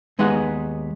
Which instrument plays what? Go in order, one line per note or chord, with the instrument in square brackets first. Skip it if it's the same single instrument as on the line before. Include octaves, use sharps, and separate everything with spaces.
[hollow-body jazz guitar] D#2 G#3 B3 D#4 D#5 F#5